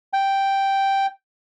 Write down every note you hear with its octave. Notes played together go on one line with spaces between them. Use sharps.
G5